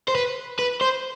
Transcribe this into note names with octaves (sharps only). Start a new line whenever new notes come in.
C5
B4
B4
C5